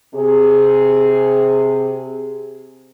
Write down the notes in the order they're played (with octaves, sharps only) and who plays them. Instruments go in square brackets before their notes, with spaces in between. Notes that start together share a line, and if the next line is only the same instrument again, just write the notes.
[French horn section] C3 G#4